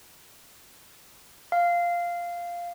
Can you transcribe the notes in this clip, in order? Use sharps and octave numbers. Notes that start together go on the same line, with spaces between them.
F5